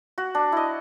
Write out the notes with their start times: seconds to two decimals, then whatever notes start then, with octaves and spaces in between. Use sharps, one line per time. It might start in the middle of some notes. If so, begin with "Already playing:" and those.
0.18 F#4
0.35 D4
0.52 E4 D#5